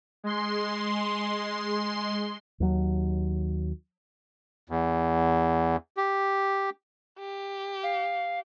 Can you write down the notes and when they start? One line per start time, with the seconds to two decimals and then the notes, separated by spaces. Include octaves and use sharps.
0.24 G#3 C6
2.60 D#2 F#3
4.70 E2
5.97 G4
7.20 G4
7.83 F5